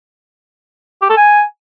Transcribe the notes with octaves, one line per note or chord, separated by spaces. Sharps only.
G4
A4
G#5